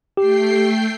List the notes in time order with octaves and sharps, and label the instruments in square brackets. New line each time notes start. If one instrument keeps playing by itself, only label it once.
[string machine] A3 G5 C7 [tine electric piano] G4